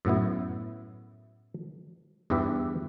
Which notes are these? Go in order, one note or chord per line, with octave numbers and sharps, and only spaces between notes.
F#2 A2 B3 E4
E2 G2 E3 G4 B4 E5